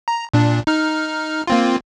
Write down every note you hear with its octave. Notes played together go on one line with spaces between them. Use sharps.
A#5
A#2 D4
D#4 F6
A#3 C4 F4